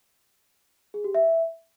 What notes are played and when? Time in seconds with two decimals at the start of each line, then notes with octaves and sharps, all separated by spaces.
0.94 G#4
1.04 G4
1.15 E5